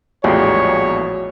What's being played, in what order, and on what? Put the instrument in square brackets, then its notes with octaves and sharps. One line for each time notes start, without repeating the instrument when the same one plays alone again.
[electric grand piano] A#1 E2 A2 [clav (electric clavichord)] F3 G3 G#3 [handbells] F#4 [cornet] C#5